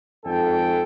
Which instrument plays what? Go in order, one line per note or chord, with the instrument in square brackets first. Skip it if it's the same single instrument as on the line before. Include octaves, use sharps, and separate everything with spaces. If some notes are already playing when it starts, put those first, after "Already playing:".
[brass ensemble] F2 G#2 A4 G5